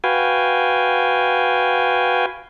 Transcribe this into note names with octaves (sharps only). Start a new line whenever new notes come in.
F#4 B4 F5 G5 G#5